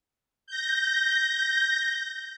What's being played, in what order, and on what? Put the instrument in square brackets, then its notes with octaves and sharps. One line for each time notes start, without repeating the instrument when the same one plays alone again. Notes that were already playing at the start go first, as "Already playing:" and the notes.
[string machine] G6 A#6